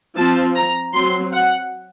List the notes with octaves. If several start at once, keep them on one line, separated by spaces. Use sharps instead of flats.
F3 C4 A5
A#5
F#3 C4 C6
F#5